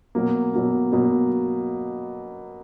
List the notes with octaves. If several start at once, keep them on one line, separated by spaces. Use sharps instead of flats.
B2 F#3 A#3
B2 F#3 A#3
B2 F#3 A#3